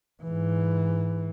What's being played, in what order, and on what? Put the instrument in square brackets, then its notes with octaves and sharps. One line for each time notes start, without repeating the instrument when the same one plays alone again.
[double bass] G#2 E3